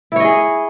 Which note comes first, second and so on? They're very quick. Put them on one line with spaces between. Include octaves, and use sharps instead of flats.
E4 C#5 D#5 G#4